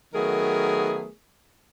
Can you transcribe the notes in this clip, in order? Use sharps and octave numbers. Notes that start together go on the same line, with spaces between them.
D#3 F#3 A3 B3 G#4 A#4